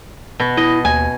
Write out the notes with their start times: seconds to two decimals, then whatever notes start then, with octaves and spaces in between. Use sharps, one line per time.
0.40 B2
0.57 E4 D#5
0.85 D#2 G#5